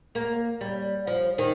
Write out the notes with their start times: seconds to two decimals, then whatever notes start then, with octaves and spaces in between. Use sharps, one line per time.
0.15 A#3
0.61 G3
1.07 F3
1.38 D#3